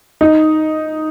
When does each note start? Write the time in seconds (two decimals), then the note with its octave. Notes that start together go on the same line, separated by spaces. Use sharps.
0.21 D#4